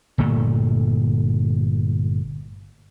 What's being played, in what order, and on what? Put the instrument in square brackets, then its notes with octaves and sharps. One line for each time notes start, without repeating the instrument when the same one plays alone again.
[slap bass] G1 A#2 A3